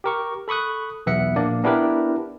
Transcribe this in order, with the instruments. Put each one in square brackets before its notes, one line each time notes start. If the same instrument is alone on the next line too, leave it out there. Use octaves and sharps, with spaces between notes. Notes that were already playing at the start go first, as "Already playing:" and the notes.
[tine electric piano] G4 A#4 C#6
A4 B5 C#6 D#6 F#6
B1 E2 B3 E5 F#5 C#7
A#1 A#3 D4 D5
B3 D4 E4 G4 A#4 B4